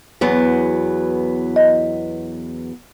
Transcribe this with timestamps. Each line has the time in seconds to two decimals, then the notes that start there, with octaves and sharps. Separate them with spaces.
0.21 E2 F#3 B3
1.56 D#5